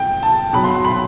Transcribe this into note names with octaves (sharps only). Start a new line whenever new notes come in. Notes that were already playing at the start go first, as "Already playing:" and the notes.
Already playing: G5
A5
B2 F#3 B5
C6
C6
B5